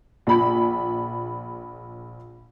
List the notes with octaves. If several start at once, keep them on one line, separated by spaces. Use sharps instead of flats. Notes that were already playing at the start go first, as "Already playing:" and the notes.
A#1 B5